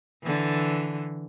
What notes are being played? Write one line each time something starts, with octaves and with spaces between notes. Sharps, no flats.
D3 E3